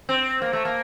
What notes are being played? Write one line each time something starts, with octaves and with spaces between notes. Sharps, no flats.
C4
A#3
A3
A#3